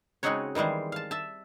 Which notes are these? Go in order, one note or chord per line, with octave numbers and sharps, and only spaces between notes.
C#3 G#3 C4 D#4 F#4 C#5
D#3 E3 G3 G#3 C5
F5 A5
E5 A5